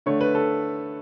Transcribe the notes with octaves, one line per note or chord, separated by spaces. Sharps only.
D3 A3 C#5
B4
A4